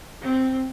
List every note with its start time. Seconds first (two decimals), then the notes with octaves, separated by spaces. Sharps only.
0.22 C4